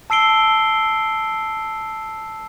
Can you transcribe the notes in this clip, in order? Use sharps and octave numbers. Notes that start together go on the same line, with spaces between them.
A5 E6 C7 D7 G7